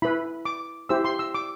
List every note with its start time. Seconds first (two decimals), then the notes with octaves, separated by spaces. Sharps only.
0.02 E4 B4 B5
0.45 D6
0.89 E4 G4 C5 E6
1.04 C6
1.19 E6
1.34 D6